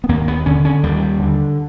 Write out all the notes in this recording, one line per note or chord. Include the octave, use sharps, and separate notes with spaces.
B3
D#2 A#3
B3
D3 C#4
C#4
D#2 G3
D3